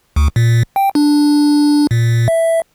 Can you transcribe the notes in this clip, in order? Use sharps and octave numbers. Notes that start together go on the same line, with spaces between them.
D2
A#2
G5
D4
A#2
E5